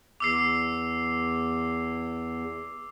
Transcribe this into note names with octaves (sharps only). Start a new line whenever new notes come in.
E2 D6 E6 C7